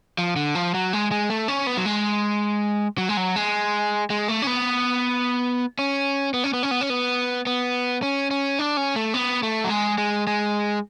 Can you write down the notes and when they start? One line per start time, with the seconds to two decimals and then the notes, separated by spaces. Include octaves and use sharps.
0.18 F3
0.36 D3
0.55 F3
0.74 F#3
0.93 G#3
1.11 G#3
1.30 A3
1.48 C#4
1.67 B3
1.77 F#3
1.86 G#3
2.98 F#3
3.09 G#3
3.17 F#3
3.36 G#3
4.10 G#3
4.28 A3
4.42 C#4
4.47 B3
5.79 C#4
6.34 B3
6.44 C#4
6.53 B3
6.63 C#4
6.71 B3
6.81 C#4
6.90 B3
7.47 B3
8.03 C#4
8.31 C#4
8.59 D4
8.77 C#4
8.96 A3
9.14 B3
9.43 A3
9.64 F#3
9.70 G#3
9.98 G#3
10.27 G#3